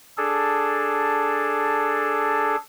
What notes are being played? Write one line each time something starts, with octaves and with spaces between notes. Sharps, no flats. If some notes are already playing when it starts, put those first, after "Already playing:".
D4 G#4 A4